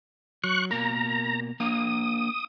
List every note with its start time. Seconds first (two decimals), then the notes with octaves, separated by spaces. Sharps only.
0.44 F#3 C#6 F#6
0.71 B2 A#3 A#4 A#5
1.60 A#3 D4 F5 D#6